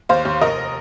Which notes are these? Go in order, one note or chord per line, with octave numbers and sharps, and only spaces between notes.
D#2 C5 F5
D#2
F1 A#4 D#5